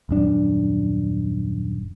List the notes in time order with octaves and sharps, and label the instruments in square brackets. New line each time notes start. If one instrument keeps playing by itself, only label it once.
[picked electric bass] D#1 F#2 D4